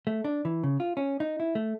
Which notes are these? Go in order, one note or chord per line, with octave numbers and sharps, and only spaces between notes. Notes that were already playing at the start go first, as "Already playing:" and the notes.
A3
D4
E3
C#3
F4
C#4
D#4
E4
A3